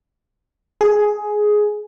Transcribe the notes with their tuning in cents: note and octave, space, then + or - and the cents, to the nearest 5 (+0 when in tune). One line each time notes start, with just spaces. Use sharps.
G#4 +10